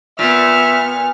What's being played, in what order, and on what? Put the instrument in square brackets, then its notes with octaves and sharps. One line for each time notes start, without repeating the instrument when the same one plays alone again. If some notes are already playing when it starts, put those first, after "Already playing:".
[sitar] A#2 [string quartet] B3 F6 [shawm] E5